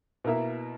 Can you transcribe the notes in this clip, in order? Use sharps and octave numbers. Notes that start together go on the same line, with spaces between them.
B2 A#3 E4 A#4 E5